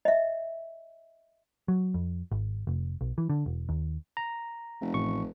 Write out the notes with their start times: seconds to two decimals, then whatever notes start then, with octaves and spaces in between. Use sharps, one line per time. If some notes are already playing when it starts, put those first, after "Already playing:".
0.05 D#5 E5
1.68 F#3
1.94 F2
2.32 G#1
2.67 F1
3.01 B1
3.18 E3
3.30 D3
3.46 E1
3.69 D#2
4.17 A#5
4.81 F1
4.94 A1 C#6